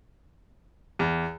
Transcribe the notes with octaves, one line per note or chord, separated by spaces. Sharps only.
E2